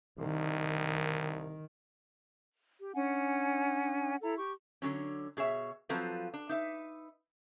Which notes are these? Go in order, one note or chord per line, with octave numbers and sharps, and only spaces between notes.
C2 D#3
G4
C#4 D4 F#5 G#5
E4 A4 A#5
G4 C#6
D3 F#3 C#4
B2 G#4 C#5 E5
F3 F#3 C4 F4 A4 B4
D4
D#4 B4 E5